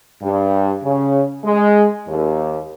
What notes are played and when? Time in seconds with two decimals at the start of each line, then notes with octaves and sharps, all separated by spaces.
0.22 G2
0.84 C#3
1.45 G#3
2.08 D#2